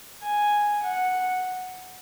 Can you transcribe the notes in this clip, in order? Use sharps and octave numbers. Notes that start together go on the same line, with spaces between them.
G#5
F#5